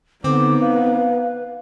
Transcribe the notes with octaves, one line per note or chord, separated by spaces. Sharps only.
D3 B3 C4 D#4 D6
B4 F5